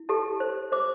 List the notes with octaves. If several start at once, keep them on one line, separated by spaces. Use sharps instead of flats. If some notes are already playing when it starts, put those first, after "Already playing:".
Already playing: E4
G4 A4 A5
C5
C5 D6